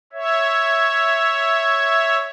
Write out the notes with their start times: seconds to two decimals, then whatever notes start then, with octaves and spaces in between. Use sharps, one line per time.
0.13 C#5 E5